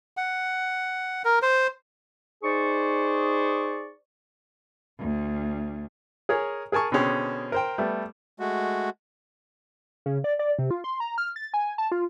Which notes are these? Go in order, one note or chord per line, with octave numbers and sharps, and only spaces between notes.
F#5
A#4
C5
D#4 G#4 C5 D5 C#6
D2
G#4 A#4 C#5 G#5
G#4 A#4 G#5 A5 C#6
B2 D3 C4 C#4 G#4
A#4 C5 G5
G3 A3 B3
G#3 A3 F#4
C#3
D5
D5
C3
F4
C6
A#5
F6
A6
G#5
A5
F4